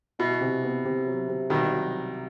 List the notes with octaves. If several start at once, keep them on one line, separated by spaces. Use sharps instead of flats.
B2 E4
C3
B3
C3
F#3
C3
C2 B2 D#3
F#3